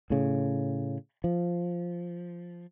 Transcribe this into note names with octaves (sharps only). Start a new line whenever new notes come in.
A2 C#3
F3